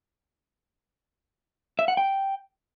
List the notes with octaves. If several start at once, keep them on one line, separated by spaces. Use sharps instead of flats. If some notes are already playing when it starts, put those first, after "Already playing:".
E5
F#5
G5